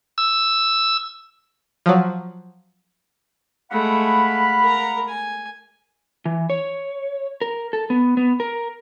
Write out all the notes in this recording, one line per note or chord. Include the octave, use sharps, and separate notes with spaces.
E6
F3 F#3
G#3 A3 F5 F#5 B5
A#4 A#5
G#5
E3
C#5
A#4
A4
B3
B3
A#4